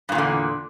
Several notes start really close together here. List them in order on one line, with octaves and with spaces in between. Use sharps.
G2 A#2 E2 D3